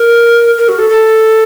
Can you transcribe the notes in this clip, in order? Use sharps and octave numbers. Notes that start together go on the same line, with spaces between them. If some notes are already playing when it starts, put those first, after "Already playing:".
Already playing: A#4
A#4
F#4
A4
A4